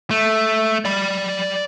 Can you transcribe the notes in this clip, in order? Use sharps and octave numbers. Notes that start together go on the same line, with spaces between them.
A3
D5 B5